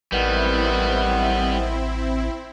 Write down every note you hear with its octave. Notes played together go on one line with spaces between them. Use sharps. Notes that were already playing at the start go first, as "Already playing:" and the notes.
A1 A2 D#3 G3 B3 C4 E4